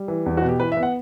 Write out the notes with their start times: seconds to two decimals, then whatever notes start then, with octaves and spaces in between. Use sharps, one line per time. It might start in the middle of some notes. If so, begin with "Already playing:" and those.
Already playing: G3
0.08 E3
0.26 E2
0.37 F#4
0.42 B2
0.49 G4
0.60 E3 B4
0.72 E5
0.77 B3
0.83 F#5